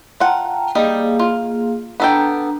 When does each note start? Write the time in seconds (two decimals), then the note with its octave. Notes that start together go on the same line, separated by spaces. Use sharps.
0.20 F4 F#5 G5 A5 A#5
0.75 G3 A#3 D#4 G#4 F5
1.19 F4
2.00 B3 D4 A4 G5 A#5